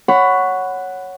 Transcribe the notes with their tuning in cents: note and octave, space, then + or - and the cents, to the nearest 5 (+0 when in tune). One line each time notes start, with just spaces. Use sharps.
C#5 +0 F#5 +0 B5 +20